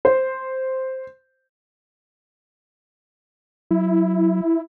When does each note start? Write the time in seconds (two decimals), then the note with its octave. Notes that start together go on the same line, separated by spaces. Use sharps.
0.05 C5
3.71 F#3 E4